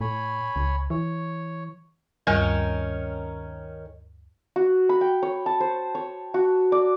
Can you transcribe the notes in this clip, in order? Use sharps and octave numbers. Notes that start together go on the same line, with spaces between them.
A2 C#5 G#5 B5
C#2
E3 C#5
D2 G2 D#3 G3 C#4 A#4
F#4
B5
G5
C#5
A5
C5
C#5
F#4
D5